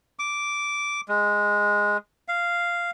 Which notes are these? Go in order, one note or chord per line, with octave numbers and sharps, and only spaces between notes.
D6
G#3
F5